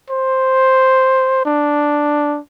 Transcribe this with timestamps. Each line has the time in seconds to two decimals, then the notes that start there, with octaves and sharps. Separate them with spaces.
0.10 C5
1.45 D4